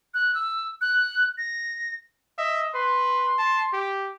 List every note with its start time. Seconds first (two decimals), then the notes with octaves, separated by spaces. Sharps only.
0.14 F#6
0.35 E6
0.81 F#6
1.38 A#6
2.38 D#5 E5
2.74 B4 C6
3.38 A5
3.73 G4